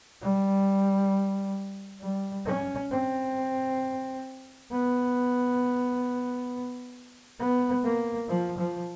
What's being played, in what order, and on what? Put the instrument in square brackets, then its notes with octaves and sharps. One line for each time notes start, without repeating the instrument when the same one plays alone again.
[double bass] G3
G3
C#4
C4
B3
B3
A#3
F3
F3